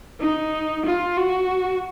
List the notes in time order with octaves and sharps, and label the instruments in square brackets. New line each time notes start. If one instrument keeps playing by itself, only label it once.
[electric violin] D#4
F4
F#4